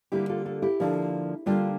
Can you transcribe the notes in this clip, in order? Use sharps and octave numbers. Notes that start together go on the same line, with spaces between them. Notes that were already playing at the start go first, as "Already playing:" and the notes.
D3 G3 A#3 E4 G4
F4 A4
F4 A4
E4 G4
D3 F3 A#3
D3 G3 A#3 D4 F4